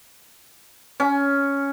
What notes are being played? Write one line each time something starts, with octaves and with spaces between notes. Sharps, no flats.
C#4